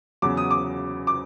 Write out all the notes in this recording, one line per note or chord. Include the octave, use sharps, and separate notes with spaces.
E2 C#3 F#3 D6
D#6
D6
D6